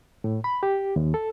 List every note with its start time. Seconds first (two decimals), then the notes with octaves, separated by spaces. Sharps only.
0.24 A2
0.44 B5
0.63 G4
0.96 D#2
1.14 A4